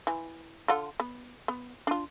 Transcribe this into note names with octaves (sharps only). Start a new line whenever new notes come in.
E3
D3 F4 F#5
B3
B3
D4 F4